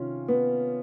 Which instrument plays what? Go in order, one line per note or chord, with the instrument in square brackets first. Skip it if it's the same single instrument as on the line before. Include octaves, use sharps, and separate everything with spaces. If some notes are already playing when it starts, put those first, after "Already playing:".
Already playing: [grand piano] C3 D#3 C#4 F4
B3